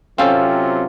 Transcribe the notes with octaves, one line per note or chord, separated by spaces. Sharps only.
C3 F#3 C4 C#4 F4 A4 C5 F5